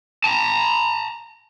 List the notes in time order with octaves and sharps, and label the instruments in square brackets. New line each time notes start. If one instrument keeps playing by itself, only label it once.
[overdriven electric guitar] A5 A#5